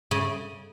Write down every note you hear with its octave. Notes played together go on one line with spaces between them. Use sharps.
C#3